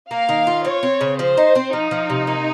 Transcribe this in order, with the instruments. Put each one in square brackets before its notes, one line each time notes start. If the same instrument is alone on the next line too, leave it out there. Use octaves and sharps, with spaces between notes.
[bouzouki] A#3 [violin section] F5
[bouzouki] D#3
F4
[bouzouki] C4 [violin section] C#5
[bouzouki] C4
C#3
[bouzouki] F3 [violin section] C5
[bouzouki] D#4
C4
[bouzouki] F3 [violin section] D#4
[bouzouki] F3
C3
A#3